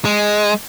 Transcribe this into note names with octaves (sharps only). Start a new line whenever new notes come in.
G#3